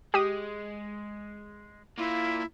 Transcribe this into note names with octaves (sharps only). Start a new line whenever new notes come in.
G#3 G4 D#6
A#3 E4 F4